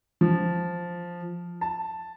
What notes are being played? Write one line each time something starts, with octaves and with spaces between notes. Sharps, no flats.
F3
A5